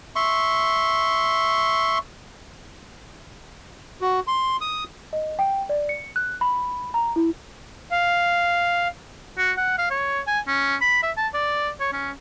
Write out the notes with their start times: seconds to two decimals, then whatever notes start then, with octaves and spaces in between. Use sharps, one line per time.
0.16 E5 C6 C#6
4.01 F#4
4.27 C6
4.61 D#6
5.13 D#5
5.39 G5
5.69 D5
5.89 C#7
6.16 F#6
6.41 B5
6.94 A#5
7.16 E4
7.91 F5
9.38 F#4
9.57 F#5
9.78 F5
9.91 C#5
10.28 G#5
10.48 C#4
10.81 B5
11.03 E5
11.17 A5
11.34 D5
11.81 C#5
11.93 C#4